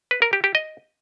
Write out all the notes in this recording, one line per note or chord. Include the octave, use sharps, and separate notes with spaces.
B4
A#4
G4
G4
D#5